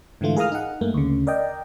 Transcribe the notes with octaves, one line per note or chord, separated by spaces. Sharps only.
G#2 D3 E3 A3 F4
G#4 A#4 F5 A#5 D#6 F6
D#4 F#5
G2 A3 A#3
D2 C#3
A#4 D5 D#5 G5